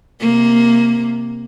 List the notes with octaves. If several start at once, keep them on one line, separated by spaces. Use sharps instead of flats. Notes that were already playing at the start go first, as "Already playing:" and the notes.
C3 A#3